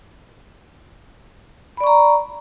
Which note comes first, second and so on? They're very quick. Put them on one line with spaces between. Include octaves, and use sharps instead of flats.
B5 D5 C#6 A#5